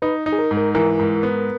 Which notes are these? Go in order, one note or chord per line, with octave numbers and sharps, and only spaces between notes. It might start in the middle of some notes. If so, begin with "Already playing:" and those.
D#4 B4
D#4
G#4
A#4
G#2
A#4
E3 A#4
G#2
B3